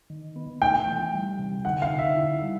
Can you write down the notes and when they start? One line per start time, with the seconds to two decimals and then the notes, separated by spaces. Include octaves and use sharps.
0.10 D#3
0.36 B3
0.62 A3 G5
0.87 E3
1.14 G3
1.39 C3
1.65 D3 F#5
1.82 F5
1.91 D3
1.99 E5
2.17 E4
2.42 G3